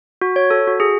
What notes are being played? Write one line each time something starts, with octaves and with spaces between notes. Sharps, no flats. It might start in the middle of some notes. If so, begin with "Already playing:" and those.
F#4
C#5
A4
F#4
G#4